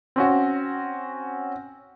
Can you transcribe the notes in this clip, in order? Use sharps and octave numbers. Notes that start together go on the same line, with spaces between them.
C4 C#4 F#4